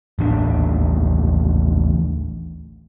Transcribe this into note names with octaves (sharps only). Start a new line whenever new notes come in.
A1 D#2 B3 D4